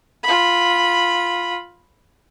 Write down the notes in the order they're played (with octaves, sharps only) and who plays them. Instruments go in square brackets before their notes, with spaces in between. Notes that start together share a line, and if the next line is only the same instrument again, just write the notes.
[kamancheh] F4 B5